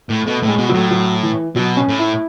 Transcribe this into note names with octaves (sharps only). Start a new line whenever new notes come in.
A2
B2 A3
A2
G#3
B2
A2 F#3
F#3
E3
B2 F#3
C#4
A2
E4